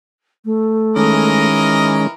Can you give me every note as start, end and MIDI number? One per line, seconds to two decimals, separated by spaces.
0.45 1.47 57
0.96 2.07 51
0.96 2.14 52
0.96 2.07 56
0.96 2.07 61
0.96 2.14 70
0.96 2.14 75